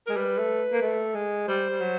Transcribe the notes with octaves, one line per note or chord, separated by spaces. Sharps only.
G#3 A#4
G3 B4
A3
A#3
A3
G#3
G3 C5
G3
F#3